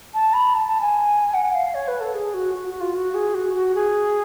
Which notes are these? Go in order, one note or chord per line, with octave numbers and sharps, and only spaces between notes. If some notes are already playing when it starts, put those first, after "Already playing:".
A5
B5
A5
A5
G#5
F#5
F5
C#5
B4
A4
G#4
F#4
F#4
F#4
F4
F#4
G#4
F#4
F#4
G#4